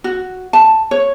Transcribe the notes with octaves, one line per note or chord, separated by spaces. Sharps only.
F#4
A5
C#5